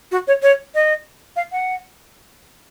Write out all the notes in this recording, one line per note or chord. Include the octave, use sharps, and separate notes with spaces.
F#4
C#5
C#5
D#5
F5
F#5